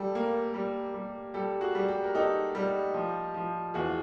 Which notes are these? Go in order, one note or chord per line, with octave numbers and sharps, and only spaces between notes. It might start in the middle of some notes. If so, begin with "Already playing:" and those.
Already playing: G3 G4 A4
A#3
G3
G3
G3 G4 A4
F#4 G#4
G3
G4
A#4
D#4 G4 A4
G3
F3
F3
E2 F#4 G#4